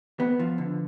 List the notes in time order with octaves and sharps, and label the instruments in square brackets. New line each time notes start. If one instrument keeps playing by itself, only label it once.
[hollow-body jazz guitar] B3
F3
D3